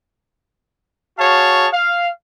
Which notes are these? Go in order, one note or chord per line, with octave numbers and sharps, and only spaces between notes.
F#4 G#4 C#5 F5 A5
F5